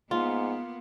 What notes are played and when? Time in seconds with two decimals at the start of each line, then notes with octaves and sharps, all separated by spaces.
0.11 G#2 A#3 B3 F4